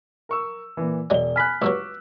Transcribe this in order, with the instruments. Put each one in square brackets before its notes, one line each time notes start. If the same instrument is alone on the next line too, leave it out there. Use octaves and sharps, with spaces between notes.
[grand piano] A#4 C#6 E6
A#2 E3
[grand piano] E1 G7 [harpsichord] F#3 G#3 [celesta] D5
[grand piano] G#5 B5 F#6 [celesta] F6 B6
[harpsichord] C#2 G2 F#3 [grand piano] C#6 D6 E6